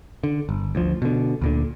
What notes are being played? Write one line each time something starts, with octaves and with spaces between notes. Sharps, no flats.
D3
G1
D2 F3
B2 D3
D2 A#2 D3